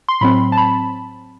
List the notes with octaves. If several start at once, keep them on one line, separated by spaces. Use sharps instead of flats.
C6
A2 F#3 C4 B5
A5
B5